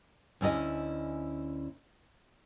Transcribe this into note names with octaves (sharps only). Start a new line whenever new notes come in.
D2 C#4 E4 D#5 G#5